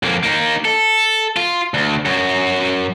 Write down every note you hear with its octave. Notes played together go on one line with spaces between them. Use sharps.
F2 A#3
A#3 D#4
A4
F4
D2
F#2 F#4